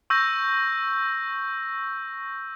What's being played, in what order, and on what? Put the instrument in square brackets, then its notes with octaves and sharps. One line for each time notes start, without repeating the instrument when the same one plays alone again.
[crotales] C#6 E6 G6 A#6